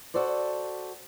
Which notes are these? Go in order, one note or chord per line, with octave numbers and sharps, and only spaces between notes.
F#4 A4 C5 D5